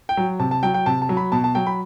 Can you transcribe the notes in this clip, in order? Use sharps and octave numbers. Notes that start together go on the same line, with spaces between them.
G5
F#3
C3 A5
A5
F#3 G5
G5
C3 A5
A5
F#3
B5
B2 A5
A5
F#3 G5
B5